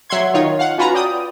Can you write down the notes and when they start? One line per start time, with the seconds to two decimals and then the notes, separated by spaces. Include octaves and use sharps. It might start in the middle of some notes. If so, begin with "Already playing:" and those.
0.10 F#3 E5 F#5 C6 G#6
0.34 D#3 D#4 F4 C#5
0.59 F5 F#5
0.78 C#4 F4 F#4 B4 A#5
0.94 D5 G5 D#6